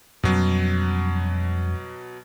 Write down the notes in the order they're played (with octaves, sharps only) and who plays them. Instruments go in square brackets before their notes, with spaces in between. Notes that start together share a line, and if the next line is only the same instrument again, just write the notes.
[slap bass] F2 G3 C#4 [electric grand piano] B2 F#3